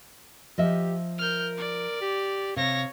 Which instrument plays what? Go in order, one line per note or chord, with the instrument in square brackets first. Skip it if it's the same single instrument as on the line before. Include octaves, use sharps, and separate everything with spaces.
[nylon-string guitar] F3 D#5 E5 [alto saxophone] G4
[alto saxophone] A#4 [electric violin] F6 G6
[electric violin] D5
[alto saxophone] G4
[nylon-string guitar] C3 [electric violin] C#5 A#6 [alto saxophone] F5